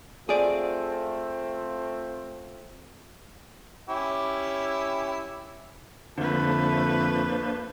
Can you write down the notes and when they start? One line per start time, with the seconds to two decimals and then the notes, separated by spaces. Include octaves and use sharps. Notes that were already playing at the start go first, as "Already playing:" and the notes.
0.29 A3 C4 F4 G#4 D5
3.89 C#4 E4 G4
6.18 F2 D3 A3 A#3 D4 B4 C5